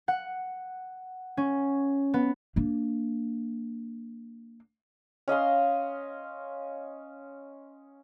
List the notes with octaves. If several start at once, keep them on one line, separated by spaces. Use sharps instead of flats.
F#5
C#4
B3
A#3 D4
C#4 D#5 F5 C6